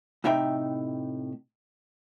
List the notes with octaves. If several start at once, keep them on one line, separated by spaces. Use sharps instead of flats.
A2 C3 D#4 E5 G5